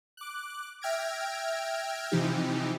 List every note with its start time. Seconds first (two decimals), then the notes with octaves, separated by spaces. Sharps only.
0.17 D6 F#6
0.81 E5 G5 F6 G#6 A#6 D7
2.12 C3 E3 F3 D#4 G4